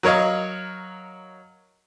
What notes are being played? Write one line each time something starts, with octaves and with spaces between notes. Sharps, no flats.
F#3 A#4 C#5 D#5 F5